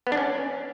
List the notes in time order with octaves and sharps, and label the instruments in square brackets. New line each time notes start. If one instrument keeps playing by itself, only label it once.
[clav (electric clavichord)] B3
D4
C#4